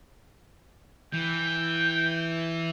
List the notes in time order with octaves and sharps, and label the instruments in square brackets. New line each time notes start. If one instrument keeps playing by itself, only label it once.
[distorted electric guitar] E3 [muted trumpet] G5